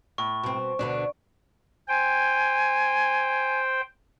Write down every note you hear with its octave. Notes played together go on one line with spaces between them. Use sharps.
A2 C#6
B2 C4
D2 B2 D3 D4
C5 G5 G#5